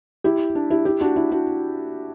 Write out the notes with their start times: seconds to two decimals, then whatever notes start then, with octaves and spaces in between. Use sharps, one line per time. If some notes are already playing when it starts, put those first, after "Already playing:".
0.24 E4 G4
0.55 D4
0.70 E4 G4
0.85 E4 G4
1.01 D4 F#4
1.16 E4
1.31 D4 F#4